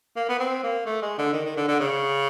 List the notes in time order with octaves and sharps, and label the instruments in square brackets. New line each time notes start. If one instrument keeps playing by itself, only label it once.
[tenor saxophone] A#3
B3
C4
A#3
A3
G#3
D3
D#3
D#3
D3
D3
C#3